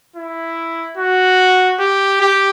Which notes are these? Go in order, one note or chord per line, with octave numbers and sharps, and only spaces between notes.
E4
F#4
G4
G4